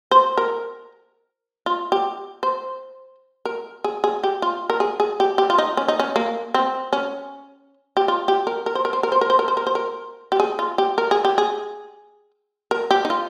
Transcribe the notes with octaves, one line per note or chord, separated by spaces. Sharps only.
C5
A#4
F4
G4
C5
A#4
G#4
G#4
G4
F4
A#4
G#4
G#4
G4
G4
F4
D#4
C#4
D#4
C#4
A#3
C4
C#4
G4
F4
G4
A#4
A#4
C5
A#4
C5
A#4
C5
A#4
C5
A#4
C5
A#4
C5
A#4
G4
G#4
F4
G4
A#4
G#4
G4
G#4
A#4
G4
D#4
F4